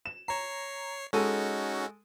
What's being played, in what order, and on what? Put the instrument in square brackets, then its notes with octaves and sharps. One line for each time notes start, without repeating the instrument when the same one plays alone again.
[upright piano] E7
[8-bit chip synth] C#5 C7 [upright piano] A#5
[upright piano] G#3 A4 D#7 [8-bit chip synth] C#4 D#4 F#4